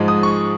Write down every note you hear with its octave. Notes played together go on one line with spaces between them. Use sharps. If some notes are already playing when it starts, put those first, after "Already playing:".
Already playing: G#2 F3 G#3
D#6
C#6